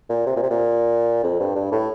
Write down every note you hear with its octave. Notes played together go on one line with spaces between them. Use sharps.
A#2
C3
A#2
C3
A#2
F2
G2
G2
A2